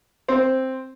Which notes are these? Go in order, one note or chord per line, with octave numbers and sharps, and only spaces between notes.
C4